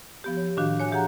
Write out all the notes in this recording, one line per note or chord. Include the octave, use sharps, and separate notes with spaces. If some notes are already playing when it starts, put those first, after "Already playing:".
F3 B3 G4
C#5
A2 D#3 D4 F#4 F5
C#5 G#5 F#6
E3 G4 G#4 F#5 A#5